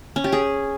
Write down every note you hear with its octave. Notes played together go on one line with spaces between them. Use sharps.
C#4
G4
G#4